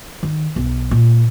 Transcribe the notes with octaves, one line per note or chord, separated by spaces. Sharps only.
D#3
B1
A#2